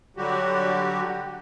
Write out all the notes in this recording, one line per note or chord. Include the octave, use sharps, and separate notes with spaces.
D3 F#3 G3 F#4 G4